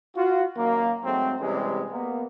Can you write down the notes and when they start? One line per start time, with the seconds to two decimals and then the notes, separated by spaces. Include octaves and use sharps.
0.16 F4 F#4
0.57 F#2 D#3 A#3
1.04 G#2 F#3 A3 C4
1.39 C3 E3 G3 G#3 C#4
1.91 A#3 B3